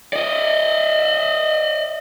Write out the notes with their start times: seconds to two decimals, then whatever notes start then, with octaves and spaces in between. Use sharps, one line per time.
0.13 D5 D#5